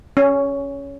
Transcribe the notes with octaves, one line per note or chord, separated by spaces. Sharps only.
C#4